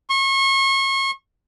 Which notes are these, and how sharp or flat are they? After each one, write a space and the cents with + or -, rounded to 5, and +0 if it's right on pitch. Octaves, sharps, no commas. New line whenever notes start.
C#6 -35